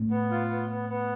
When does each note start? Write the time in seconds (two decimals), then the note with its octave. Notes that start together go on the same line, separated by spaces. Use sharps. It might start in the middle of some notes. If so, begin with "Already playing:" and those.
Already playing: A2
0.11 B3
0.31 F4
0.50 B3
0.70 B3
0.89 B3